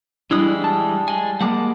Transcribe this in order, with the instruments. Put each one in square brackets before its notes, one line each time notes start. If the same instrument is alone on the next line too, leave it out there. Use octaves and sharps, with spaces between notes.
[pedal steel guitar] E3 G#3 D#6 [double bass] G3 [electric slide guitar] D4 E4
[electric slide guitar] A5
[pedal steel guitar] G#3 G#5
[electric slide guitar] G3 G#3 A#3 [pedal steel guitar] F#5 A5 D6